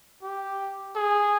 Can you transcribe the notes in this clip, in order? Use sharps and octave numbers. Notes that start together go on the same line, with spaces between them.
G4
G#4